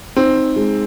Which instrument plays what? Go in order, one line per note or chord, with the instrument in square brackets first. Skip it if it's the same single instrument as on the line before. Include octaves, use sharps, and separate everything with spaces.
[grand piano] C4 [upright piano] D#4
[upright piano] G#3